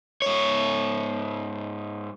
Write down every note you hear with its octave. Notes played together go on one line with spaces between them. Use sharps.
G#2 C#5